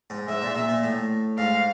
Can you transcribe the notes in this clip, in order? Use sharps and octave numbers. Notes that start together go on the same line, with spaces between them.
G#2
G#2 E5
A#2
A#2
A#2
A2
G#2 F5